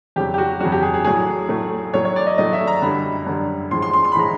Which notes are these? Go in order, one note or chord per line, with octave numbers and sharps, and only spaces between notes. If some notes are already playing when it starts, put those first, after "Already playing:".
F2 C#3 F#3 G4
G4
F#4
F2 C#3 F#3 F#4
G4
G#4
G#4
A2 F#3 A3 G#4
A2 F#3 A3
A2 F#3 A3 C#5
C#5
D5
D#5
A2 F#3 A3 D#5
E5
A#5
F#2 D3 G3 B5
F#2 D3 G3
A2 F3 G#3 C6
C6
C6
C6
B5
A2 F3 G#3 A#5